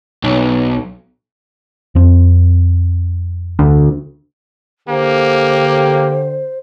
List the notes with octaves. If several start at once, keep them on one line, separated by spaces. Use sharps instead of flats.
B1
F2 C4
D2
D3 A#3 G4 C5